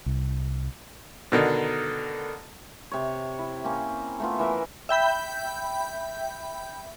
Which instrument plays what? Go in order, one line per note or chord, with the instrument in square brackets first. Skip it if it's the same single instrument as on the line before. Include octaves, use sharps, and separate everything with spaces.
[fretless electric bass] C2
[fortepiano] B2 D3 D#3
[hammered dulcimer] C3 C#5
E4
A#3 C4 C#4
A3 B3 F4
E3 A#4 E5
[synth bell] E5 G5 B5 G6